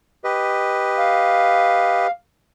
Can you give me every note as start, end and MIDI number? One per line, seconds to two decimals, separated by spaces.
0.24 2.07 67
0.24 2.07 71
0.24 2.07 75
0.98 2.11 77